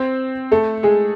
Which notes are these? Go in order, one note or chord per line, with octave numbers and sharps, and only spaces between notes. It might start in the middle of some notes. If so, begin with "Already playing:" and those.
Already playing: C4 C5
A3 A4
G#3 G#4